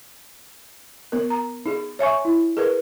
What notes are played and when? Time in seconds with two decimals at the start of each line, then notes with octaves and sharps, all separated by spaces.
1.12 B3 A#4
1.30 A#5
1.66 D#4 G#4
1.99 C#5 E5 G#5 C#6
2.25 E4
2.57 G#4 A#4 B4